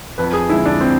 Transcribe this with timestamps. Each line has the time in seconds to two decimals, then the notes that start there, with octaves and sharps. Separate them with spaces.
0.18 F2 B4
0.33 G#4
0.49 D3 G#3 E4
0.65 D4
0.81 C4